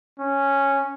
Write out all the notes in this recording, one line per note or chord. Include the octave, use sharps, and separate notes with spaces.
C#4